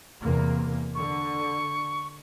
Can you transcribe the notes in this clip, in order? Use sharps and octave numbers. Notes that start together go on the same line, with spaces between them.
E2 C3 A#3
D3 C#6